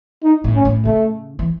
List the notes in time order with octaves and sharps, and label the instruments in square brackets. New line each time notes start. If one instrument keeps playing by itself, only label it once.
[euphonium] D#4
[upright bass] A2
[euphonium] C#4
[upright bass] A2
[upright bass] C#3 [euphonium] A3
[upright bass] E3